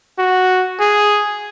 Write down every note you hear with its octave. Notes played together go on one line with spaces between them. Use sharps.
F#4
G#4